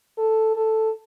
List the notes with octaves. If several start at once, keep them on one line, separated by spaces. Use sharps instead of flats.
A4
A4